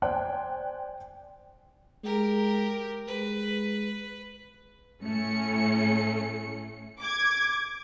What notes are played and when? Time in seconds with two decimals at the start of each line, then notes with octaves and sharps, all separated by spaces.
0.02 C5 D5 G5 G#5 F#6
2.04 G#3 G4 A#4
3.07 G#3 B4
5.03 A2 A3 C#4 C#7
6.99 D6 G#6